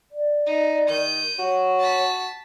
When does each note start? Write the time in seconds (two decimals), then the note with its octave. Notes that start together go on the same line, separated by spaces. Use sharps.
0.12 D5
0.46 D#4
0.90 D#3 G6 D#7
1.39 F#4 C#5
1.79 A5 B6